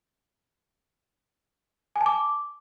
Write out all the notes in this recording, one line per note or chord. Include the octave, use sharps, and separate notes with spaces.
G#5
A5
D6